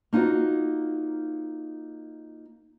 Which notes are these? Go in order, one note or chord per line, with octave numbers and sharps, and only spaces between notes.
A#3 D#4 F4 F#4 C5